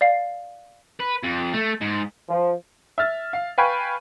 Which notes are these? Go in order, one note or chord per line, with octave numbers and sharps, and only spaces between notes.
D5 F5 C7
B4
F2
A3
G#2
F3
E5 F6 A6
F5
B4 F5 G5 G#5 B5 C#6